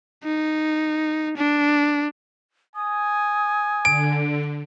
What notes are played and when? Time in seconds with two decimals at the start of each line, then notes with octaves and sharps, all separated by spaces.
0.24 D#4
1.36 D4
2.76 G#5 D#6
3.85 D3 D7